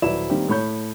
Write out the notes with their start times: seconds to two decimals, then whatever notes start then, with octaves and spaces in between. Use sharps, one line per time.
0.02 D#1 F#3 E4 B4 D5 E7
0.30 D#3 G3 A#3 C4 G4
0.48 A2 C#5 B5 G6